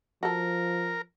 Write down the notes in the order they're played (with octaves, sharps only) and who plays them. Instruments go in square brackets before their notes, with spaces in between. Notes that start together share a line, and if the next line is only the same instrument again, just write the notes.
[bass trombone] F3 [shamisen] F#4 A4 [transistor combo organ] A#4